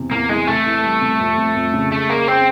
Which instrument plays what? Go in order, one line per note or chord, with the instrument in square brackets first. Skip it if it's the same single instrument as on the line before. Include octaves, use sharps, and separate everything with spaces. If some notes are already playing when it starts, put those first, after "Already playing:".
Already playing: [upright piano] E2 C3
[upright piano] E2 [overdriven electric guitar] A#3
[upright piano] E3 [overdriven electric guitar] G#3
[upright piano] C3 [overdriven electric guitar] A3
[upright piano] E3
G3
C3
F2
F2
F2
C#3
[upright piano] G#3 [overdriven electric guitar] A3
[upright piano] G#3 [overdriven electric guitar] A#3
[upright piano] G#3 [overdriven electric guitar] C4